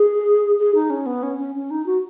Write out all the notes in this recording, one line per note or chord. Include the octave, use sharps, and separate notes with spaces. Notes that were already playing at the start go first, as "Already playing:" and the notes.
Already playing: G#4
G#4
D#4
C#4
B3
C#4
C#4
C#4
D#4
F#4